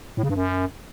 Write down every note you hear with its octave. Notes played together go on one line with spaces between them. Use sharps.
A2
C#3
G2
F#2